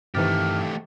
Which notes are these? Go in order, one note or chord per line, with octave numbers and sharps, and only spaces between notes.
G2 C3 D#3 E3 A3 G4 F6 A6